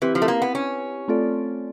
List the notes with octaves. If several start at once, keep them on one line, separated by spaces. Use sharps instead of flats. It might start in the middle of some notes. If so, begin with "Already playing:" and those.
E3 C4 E4 G4 B4
F3
A3
A#3
B3
C#4
A3 C4 F4 A4 D5